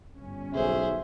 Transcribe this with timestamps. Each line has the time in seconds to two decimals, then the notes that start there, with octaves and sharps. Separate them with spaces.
0.19 G1 C#4
0.55 B1 G#4 C5 E5